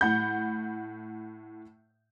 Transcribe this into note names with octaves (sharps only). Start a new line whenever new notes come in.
A2 F#5 B5 G6